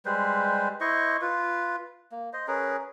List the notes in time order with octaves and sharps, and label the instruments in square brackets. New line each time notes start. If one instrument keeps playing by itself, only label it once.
[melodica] G3 G#3 B4 C5
E4 C5 D#5 C#6
F4 B4
A#3
C5 D#5
C#4 G#4 A#4 B4